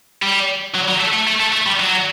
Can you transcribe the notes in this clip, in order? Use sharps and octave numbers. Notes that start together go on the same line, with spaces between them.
G3
F#3
F#3
A3
A3
A3
A3
A3
G3
F#3